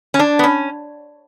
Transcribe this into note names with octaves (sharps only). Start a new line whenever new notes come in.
C#4
D4
B3
C#4